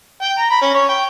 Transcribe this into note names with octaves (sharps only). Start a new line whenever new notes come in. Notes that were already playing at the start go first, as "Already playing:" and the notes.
G5
A#5
B5
C#4
C#5
G5